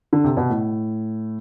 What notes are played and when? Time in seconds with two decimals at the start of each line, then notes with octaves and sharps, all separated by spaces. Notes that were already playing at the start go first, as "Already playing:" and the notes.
0.13 D3
0.24 C3
0.37 B2
0.50 A2